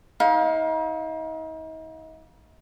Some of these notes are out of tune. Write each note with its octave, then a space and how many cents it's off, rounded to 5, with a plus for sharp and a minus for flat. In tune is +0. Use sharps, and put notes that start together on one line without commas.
D#4 +40 F5 +20